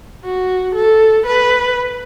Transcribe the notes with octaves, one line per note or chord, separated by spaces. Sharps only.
F#4
A4
B4